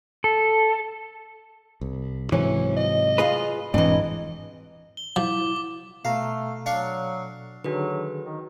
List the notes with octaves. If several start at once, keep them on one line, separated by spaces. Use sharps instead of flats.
A4
C2
G#2 C3 E3 F#3 C#4
D#5
F4 G#4 B4
E1 G#2 E3 C4 D4 D#5
G7
F3 E4 D6
B2 A3 A4 F5 A#5
F#3 D4 F5 C#6
D3 D#3 F#3 F#4 G#4 A4 B4
D#3